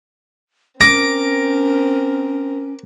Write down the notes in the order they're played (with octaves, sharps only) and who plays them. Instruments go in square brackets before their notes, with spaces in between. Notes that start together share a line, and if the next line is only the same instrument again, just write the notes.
[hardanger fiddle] C4 A#4 [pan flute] C#4 [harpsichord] D6 [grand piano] A#6